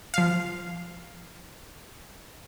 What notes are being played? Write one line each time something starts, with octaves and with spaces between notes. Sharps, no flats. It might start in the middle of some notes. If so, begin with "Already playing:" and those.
F3 F5